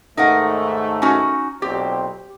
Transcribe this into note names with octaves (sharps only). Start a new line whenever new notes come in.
D#2 G#2 A3 D#4 A#4 F#5
C#4 D#4 F#4
B1 A#2 C4 G4